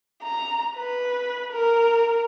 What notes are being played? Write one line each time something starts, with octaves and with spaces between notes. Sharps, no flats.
A#5
B4
A#4